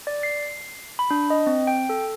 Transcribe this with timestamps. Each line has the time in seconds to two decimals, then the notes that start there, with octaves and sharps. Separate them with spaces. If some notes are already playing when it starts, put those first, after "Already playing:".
0.07 D5
0.23 C7
0.99 B5
1.11 D4
1.30 D#5
1.47 C4
1.67 G5
1.89 A4